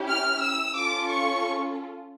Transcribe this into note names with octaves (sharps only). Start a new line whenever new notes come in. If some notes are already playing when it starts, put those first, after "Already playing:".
Already playing: C#4 E4 G4
F6
E6
C#4 F4 A4 D6
C#6